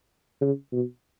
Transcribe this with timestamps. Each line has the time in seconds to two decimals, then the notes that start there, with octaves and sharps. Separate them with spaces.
0.41 C#3
0.73 B2